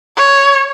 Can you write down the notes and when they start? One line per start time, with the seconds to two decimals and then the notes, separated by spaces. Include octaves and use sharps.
0.17 C#5